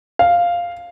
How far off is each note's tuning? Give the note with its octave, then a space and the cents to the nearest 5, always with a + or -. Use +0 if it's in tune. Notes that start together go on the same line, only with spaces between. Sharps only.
F5 +0